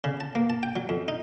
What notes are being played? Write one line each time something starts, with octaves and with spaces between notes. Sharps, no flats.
C#3
A5
A#3
A5
G5
F#3
F2
D#4